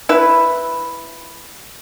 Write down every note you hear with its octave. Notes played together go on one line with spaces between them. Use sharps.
E4 B4